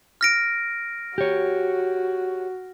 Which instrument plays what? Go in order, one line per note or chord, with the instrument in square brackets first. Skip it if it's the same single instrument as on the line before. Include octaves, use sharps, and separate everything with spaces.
[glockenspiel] F6 A#6 D7
[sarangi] F#4 [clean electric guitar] G4 C#5